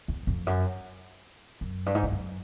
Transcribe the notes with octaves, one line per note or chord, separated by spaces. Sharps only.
E2
F2
F#2
F#2
G2
G#2
G2
F#2